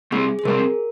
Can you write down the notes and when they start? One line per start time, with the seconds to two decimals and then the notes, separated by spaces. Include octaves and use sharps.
0.12 C3 G3 C4 G#4
0.39 G#4
0.45 C3 G3 C4 A#4